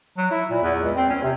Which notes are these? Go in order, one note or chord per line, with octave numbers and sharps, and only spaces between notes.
F#3
E4
A#2
E2
C#2
C4
C#4
C3